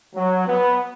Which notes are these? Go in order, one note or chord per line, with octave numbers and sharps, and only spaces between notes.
F#3
B3